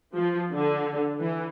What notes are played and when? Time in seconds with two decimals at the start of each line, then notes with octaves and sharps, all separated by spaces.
0.14 F3
0.52 D3
1.20 E3